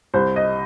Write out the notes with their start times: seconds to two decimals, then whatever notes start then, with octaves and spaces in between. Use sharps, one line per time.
0.14 C2 C5
0.36 D#5